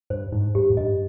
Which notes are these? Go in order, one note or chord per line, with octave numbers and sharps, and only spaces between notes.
G2 C5
G#2 D#4
G2 G4
G#2
G2 D#5